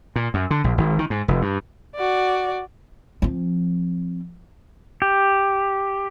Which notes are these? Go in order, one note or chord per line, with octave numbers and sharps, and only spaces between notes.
A#2
F#2
D3
A#1
G#1
D#3
G#2
F1
G2
F#4 D5
F3 C4
G4